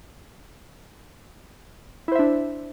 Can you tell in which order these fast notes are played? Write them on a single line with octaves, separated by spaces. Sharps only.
E4 C5 E5 D4